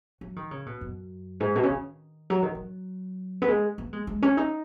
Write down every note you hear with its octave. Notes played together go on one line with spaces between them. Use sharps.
F#3
D#3
C#3
B2
F#2
G#2
B2
C#3
D#3
F#3
D#3
F#3
B3
G#3
B3
G#3
G#3
C#4
D#4